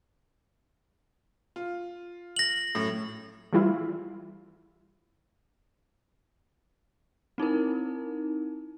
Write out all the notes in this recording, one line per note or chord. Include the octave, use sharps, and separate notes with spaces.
F4
A#6 F#7
F#2 A2
E3 G3 E4 F4
C4 D#4 E4 A#4